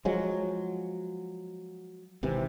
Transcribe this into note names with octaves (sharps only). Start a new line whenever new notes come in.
F3 F#3 G#3
G#1 C3 E3